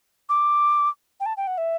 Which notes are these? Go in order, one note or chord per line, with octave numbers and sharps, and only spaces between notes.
D6
G5
A5
G5
F#5
E5